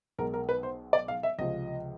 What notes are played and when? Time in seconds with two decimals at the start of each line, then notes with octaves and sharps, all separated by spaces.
0.18 B1 B2 G#3 A#4
0.34 A#4
0.49 B4
0.63 C5
0.93 D5
1.08 F5
1.23 E5
1.38 C#2 C3 F3 D#5